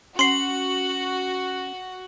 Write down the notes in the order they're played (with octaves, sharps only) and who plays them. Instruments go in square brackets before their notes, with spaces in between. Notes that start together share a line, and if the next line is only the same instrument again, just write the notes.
[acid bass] C#4 [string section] F#4 [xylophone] C6 C7 [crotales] F#7